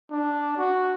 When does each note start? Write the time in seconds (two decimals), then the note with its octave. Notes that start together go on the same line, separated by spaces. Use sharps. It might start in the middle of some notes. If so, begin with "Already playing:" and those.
0.11 D4
0.57 F#4